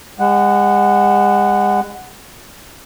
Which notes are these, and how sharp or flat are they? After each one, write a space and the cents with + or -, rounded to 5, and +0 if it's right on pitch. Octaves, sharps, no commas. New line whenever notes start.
G#3 -40 F#5 +0